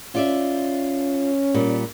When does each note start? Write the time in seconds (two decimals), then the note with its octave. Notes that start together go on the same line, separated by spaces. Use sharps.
0.15 C#4 F4 D5 E5
1.54 A#2 G3